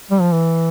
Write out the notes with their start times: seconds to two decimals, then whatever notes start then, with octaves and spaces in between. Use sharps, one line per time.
0.11 G3
0.21 F3
0.32 E3